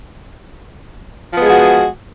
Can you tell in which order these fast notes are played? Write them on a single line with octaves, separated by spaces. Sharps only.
F3 B3 G#3 G#4 F#4